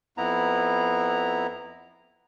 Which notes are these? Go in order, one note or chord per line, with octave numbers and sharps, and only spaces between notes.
F2 B3 E4 A#5